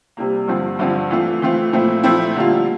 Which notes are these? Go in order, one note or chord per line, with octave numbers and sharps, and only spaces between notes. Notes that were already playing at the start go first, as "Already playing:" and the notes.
C3 G3 A#3
G2 D3 F3 C4
G2 D3 F3 C4
E3 A3 C4 F4
E3 A3 C4 F4
A#2 F3 A3 C4 E4
A#2 F3 A3 C4 E4
D3 G3 A#3 F4